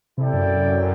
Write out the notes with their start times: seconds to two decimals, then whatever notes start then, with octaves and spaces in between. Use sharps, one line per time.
0.18 C3 E4 A4 D5 G5
0.33 F#2